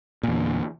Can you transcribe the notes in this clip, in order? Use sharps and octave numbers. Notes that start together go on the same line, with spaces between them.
E2 A#2 D3